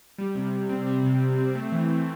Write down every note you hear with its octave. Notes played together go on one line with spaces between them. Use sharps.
G3
C3
C3
C4
G3
C3
C3
C4
A3
E3
E3